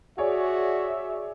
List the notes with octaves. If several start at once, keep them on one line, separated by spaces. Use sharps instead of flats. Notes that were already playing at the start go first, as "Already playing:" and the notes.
F#4 G#4 C#5 D5 E5